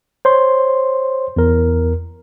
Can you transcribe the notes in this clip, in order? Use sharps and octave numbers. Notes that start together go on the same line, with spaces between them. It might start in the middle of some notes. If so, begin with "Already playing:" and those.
C5 C#5 C6
E2 A#4